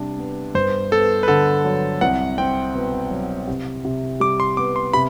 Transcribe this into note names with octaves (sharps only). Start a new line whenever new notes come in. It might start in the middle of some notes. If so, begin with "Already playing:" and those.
Already playing: C3 G3 D4
B3
G2 C5
B3 A4
B4
D3 A4
F#3
C2 F#5
C4 G5
B2
F#3
C3
C3
G3 D6
C6
B3 D6
C6
C3 B5